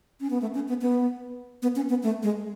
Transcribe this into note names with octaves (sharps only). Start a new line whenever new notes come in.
C#4
B3
A3
C#4
B3
B3
B3
C#4
B3
A3
G#3